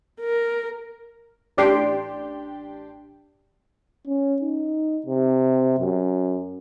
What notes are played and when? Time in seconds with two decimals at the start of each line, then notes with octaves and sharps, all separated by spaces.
0.21 A#4
1.57 A1 D4 G4 G5 C6
4.07 C#4
4.42 D#4
5.06 C3
5.80 F#2